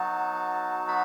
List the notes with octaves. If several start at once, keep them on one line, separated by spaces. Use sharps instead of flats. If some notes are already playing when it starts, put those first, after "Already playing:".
Already playing: F#3 B3 D#4 F#4 A5
B5